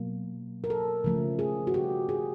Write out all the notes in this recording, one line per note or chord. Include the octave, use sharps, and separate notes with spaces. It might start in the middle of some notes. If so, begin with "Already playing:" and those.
Already playing: B2 F#3 A#3
A#4
A4
C#3 F3 A3
G#4
F#4
G4
G#4